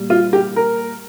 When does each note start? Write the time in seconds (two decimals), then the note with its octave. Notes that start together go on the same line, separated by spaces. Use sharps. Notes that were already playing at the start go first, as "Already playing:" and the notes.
Already playing: A#2 G3
0.10 F4
0.33 G4
0.56 A#4